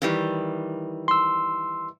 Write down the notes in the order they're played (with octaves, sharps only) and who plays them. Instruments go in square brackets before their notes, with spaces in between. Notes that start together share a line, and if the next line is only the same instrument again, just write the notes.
[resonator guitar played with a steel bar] D#3 E3 G3
[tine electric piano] C6 E6